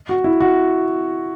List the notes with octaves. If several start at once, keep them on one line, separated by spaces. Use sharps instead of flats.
F#4
E4
F#4